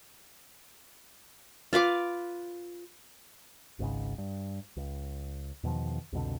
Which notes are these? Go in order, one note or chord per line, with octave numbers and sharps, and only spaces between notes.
F4 B4 F5 D6
G#1 C#2 G#2 C#3
G2
C#2
E2 B2 D#3 F3
C2 F2 B2 D3